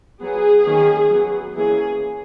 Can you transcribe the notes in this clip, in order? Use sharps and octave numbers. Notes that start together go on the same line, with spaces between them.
F#3 B3 G#4
D#3 A#3 C#4
F#3 B3
E3 A#3 C#4 G#4